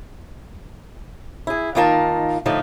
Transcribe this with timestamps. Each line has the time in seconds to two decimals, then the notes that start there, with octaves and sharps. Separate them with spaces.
1.47 E4 G#4
1.75 D#3 A#3 D#4 F4 A#4 A5
2.46 A2 D3 F3 A3 D#4